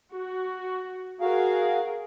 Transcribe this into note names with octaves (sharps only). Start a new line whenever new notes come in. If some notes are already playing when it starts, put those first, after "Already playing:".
F#4
F#4 G#4 A#4 F5